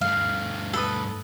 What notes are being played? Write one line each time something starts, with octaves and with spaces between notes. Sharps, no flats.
G2 A3 F5
A4 B4 D#6